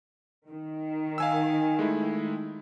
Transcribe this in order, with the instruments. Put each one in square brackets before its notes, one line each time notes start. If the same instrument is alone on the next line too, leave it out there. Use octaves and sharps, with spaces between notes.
[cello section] D#3
[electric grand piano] F5 G#5 E6
G#3 A3 E4